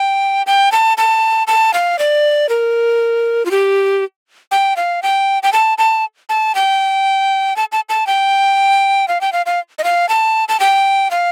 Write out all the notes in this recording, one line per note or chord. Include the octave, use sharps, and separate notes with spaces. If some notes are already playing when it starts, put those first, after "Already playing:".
Already playing: G5
G5
A5
A5
A5
F5
D5
A#4
F4
G4
G5
F5
G5
G5
A5
A5
A5
G5
A5
A5
A5
G5
F5
G5
F5
F5
D#5
F5
A5
A5
G5
F5